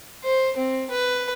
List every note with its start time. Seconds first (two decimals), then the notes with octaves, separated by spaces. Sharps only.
0.24 C5
0.57 C4
0.90 B4